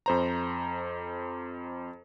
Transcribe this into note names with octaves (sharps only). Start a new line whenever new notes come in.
F2 C5 A#5